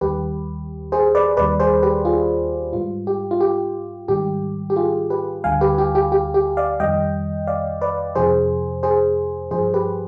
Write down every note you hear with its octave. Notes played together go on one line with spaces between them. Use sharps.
D#2 D#3 G3 G4 B4
G#4 C5
B4 D5
D#2 D#3 G3 B4 D5
G#4 C5
G4 B4
F4 G#4
G#2 G3 F4
G4
F4
G4
G#2 D#3 G3 G4
G4
F4 G#4
G4 B4
D2 D3 G3 F5 G#5
G4 B4
G4
G4
G4
G4
D5 F5
F2 D#3 G3 D#5 G5
D5 F5
B4 D5
F2 C3 F3 G#4 C5
G#4 C5
G2 F3 G#4 C5
G4 B4